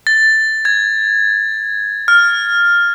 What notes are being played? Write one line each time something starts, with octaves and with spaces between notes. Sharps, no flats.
A6
G#6
F6